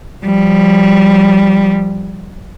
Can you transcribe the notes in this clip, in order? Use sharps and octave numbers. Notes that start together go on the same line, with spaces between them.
F3 G3